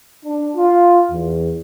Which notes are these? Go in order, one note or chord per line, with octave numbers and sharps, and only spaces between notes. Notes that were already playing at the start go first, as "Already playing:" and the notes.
D4
F4
E2